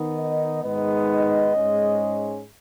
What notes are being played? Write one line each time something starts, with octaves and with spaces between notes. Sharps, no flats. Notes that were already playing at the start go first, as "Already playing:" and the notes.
Already playing: D#3 B3 D#4
D#5
G#2 D#3 G#3 B3 D#4 D#5
D#5
G#2 G#3 C#4